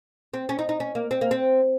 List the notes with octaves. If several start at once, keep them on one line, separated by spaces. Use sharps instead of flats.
C4
C#4
D#4
D#4
C#4
A#3
C4
A#3
C4